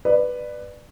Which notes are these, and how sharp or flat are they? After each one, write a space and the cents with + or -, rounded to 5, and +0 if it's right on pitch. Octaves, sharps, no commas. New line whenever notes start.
B4 +0 D5 +20